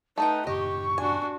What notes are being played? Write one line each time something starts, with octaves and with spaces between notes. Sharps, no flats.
A3 D#4 A4 B4 G5
F#2 A2 C#3 G4 D#5 C#6
D4 F#4 G#5